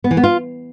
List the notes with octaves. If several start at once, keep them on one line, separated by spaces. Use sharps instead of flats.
B3
E3
B3
F4